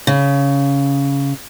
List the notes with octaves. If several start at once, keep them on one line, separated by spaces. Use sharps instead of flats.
C#3